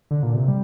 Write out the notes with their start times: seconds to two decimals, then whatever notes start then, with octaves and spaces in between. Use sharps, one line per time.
0.11 D3
0.23 A#2
0.36 C3
0.48 G3